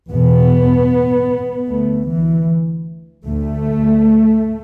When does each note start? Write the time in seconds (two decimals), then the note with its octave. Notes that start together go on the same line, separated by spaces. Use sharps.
0.11 E2 B2 B3
1.69 D2 A3
2.08 E3
3.25 D2 A3